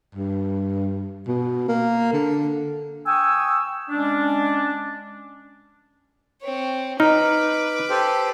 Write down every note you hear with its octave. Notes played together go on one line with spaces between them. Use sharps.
G2
B2
A#3
D3
G5 G#5 C#6 D#6 E6
G#3 C#4 D4
C4 C#5
D#4 B4 D6 F6
G4 A4 C5